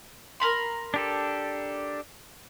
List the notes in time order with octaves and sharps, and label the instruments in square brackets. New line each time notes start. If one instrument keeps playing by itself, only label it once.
[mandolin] A#4 B5 C6
[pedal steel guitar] D4 G4 A4